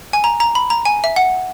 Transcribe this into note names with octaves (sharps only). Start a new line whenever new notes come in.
G#5
A#5
A#5
B5
A#5
G#5
E5
F#5